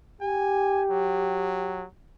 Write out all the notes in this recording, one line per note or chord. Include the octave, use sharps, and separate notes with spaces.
G4 G#5
F#3